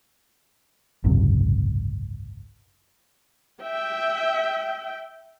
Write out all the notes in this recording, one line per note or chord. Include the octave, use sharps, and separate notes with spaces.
G#1 C#2 F#2 C3
E5 G5